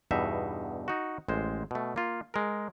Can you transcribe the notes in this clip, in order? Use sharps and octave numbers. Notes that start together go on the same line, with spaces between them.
E2 G2 B2 D#4 E5
D#4 F#4
A1 G#3 C5
B2 A3
A#3 F4
G#3 A#4